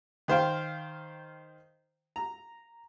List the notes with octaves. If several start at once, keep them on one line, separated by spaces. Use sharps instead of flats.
D#3 C5 F5 G5
A#5